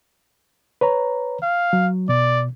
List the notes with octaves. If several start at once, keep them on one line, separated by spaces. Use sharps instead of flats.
B4 C#5 A#5
F5
F#3
B2 D5